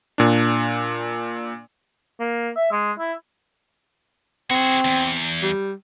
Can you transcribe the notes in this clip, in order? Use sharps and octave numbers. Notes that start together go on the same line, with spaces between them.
A#2 D4
A#3
E5
G#3
E4
C4 F#4 G#4
E2
G3